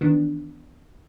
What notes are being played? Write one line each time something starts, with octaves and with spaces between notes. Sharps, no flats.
D#3 E3 B3 D4